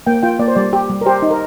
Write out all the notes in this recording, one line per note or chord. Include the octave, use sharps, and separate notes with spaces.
A#3 G5
F4 G5
A#3 D5
C5
G3 D5
G4
G3
A#4
G4 C5
D#4
A#4